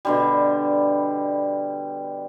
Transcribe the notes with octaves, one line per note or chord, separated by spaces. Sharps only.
B2 D3 G3